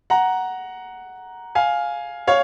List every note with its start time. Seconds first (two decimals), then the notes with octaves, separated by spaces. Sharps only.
0.10 F#5 A#5
1.55 F5 G#5
2.27 C#5 F5